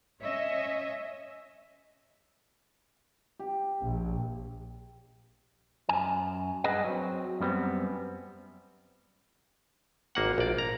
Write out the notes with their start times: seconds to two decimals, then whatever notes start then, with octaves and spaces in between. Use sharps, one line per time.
0.22 C#4 C#5 D#5 E5
3.39 G4
3.83 A#1
5.89 F#2 G#5
6.64 G2 G#4 B4 D#5 F#5
6.84 F#3 C4
7.40 F#2 G3 B3 C4
10.15 G#1 A#3 F#5
10.38 A#1 D5
10.58 A#5